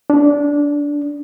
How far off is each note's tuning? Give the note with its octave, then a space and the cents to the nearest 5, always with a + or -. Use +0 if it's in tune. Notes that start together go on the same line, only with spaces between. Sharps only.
D4 -15